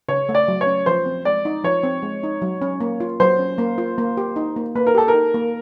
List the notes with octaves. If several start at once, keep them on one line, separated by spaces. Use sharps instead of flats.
C#3 C#5
A3
D5
F#3
C#5
C#4
F3 C5
C4
G#3 D5
D#4
F3 C#5
C4
G#3
D#4
F#3
C#4
A#3
F4
F#3 C5
C#4
A#3
F4
A#3
G4
D#4
A#3
A#3 B4
A#4
G4 A4
A#4
D#4
A#3